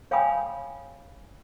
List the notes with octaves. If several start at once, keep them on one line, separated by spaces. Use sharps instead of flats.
C#5 F5 G5 G#5 B5 D#6